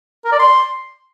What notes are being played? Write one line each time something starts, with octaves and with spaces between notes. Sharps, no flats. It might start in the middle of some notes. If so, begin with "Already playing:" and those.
A#4
D5
C6